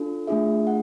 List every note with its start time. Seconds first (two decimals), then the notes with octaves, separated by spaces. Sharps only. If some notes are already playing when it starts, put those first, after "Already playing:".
Already playing: D4 F4 A4
0.27 A3 D4 F4 G#4 E5
0.67 F#5